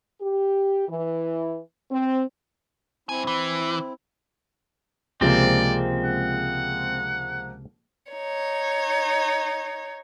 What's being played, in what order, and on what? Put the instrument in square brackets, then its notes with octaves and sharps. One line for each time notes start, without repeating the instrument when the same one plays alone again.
[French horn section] G4
E3
C4
[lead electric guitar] G2 G#5 [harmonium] C4 E4
[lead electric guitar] E3
[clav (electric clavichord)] C#2 C3 [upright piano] F3 G#3 A#3 [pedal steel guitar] C4 [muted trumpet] D5
[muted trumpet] F#5
[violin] D#4 C#5